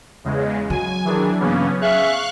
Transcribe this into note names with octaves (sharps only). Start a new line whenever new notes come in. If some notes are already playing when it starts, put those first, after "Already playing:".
E2 C#3 G#3
F#3 G#5
D#3 E3 D4 G#4
G2 C#3 E3 A#3 B3 C#4
C#4 G#4 E5 F5 C#6 F#6